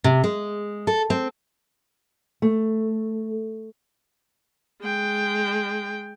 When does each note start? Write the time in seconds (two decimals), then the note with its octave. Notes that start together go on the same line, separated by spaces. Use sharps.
0.04 C3
0.24 G#3
0.87 A4
1.10 C4
2.42 A3
4.82 G#3 G5